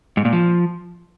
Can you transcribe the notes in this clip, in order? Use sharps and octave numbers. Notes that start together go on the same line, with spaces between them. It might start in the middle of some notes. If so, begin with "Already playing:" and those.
G#2
A#2
F3